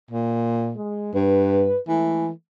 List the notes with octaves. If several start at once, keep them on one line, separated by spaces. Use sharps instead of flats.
A#2
G#3
G2 B4
E3 G#3 A3